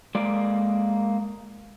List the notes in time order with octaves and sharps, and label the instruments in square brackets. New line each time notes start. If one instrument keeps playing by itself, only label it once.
[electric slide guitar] G#3 A#3 D5